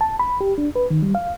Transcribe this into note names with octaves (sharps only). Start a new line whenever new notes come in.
A5
B5
G4
D4
B4
D#3
G3
F5